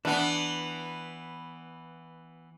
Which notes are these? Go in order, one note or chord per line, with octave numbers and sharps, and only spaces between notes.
E3 B3 D4